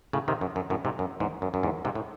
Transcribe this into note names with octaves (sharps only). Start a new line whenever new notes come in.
A2 C#3
C3 D#3
F#2
F#2
F#2 A2
G#2 C3
F#2
E2 G#2
F#2
F#2
E2 G#2
G#2 C3
A2